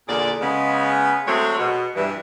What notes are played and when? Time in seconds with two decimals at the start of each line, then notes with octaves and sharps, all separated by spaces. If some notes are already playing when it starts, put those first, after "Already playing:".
0.08 E2 A#2 D3 G#4 D5
0.41 C#3 G#3 B3
1.27 F#3 G#3 A3 C4 G#4 C#5
1.58 B2
1.95 G2 E3